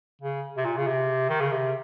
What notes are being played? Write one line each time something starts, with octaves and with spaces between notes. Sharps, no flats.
C#3
C3
A#2
C#3
C3
D#3
C#3
C3